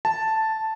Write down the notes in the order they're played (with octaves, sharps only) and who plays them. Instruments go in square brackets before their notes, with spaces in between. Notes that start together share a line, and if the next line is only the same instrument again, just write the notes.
[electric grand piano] A5